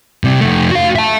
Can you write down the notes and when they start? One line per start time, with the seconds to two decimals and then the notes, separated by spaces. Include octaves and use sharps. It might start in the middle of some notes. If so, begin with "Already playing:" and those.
0.24 C3 G3
0.41 F2 A3
0.71 F#4 F5
0.96 E5 A5